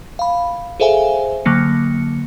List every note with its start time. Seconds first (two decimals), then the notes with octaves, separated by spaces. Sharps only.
0.19 F5 B5
0.80 G#4 A4 C5 E5 F5 G#5
1.45 D3 F#3 A#3 C#7